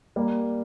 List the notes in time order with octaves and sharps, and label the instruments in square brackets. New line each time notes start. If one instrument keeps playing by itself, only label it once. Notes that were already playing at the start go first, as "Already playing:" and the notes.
[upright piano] G3 A#3